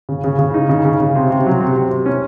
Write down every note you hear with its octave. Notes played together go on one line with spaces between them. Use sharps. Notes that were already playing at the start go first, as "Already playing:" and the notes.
C#3
C#3
C#3
D#4
C#3
C#3
C#3
C3
C3
F#3
C3
C3
C3
C#4